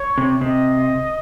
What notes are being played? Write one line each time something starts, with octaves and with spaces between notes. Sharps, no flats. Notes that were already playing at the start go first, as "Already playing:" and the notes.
Already playing: C#5
C3
C3 D#5